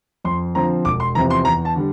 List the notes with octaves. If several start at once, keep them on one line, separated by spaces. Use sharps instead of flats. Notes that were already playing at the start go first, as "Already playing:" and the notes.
F2 C6
D3 F3 C4 A#5
E1 D6
C6
E2 C3 F3 C4 A#5
C6
E2 A#5
A5
D3 G3